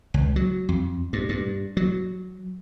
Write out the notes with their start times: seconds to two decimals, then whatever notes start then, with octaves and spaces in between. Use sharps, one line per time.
0.14 C#2
0.36 F#3
0.69 F2
1.13 G2
1.29 G2
1.77 F#3